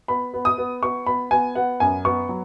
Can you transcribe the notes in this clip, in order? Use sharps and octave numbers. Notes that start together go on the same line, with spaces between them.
B3 B5
B3
D#6
B3
B3 C#6
B3 B5
B3 G#5
B3 F#5
F#2 G#5
B3 C#6
F#3